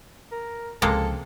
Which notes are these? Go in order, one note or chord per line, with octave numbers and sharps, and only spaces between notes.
A#4
C#2 C3 F3 G#3 A#3 A4